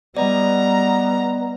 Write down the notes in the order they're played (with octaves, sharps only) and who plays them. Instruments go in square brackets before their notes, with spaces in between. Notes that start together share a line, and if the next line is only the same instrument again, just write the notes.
[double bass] G3 [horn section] B3 [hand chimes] D5 D#5 [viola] A#5